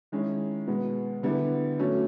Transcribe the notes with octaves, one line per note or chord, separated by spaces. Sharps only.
D#3 G#3 C#4 E4
B2 G#3 B3
D3 G3 B3 E4
F#3 A3 C#4